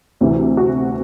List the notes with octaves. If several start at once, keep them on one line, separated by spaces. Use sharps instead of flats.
D2 C3 E3
F#4